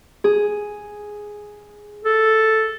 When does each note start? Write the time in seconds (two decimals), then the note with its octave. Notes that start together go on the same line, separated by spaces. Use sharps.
0.24 G#4
2.05 A4